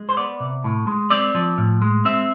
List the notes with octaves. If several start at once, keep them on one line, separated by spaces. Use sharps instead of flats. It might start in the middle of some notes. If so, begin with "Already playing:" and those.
Already playing: G#3
C5
B3 D5
C3
A2
G#3
C4 D5
F3
A2
G#3
C4 E5